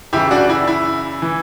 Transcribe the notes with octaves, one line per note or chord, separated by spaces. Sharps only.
F#2 C#3 E3 E4 G4
D4 F#4
E4
E4
E3